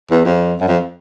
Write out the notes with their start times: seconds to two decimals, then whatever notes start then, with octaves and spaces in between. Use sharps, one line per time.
0.11 E2
0.25 F2
0.60 F#2
0.68 F2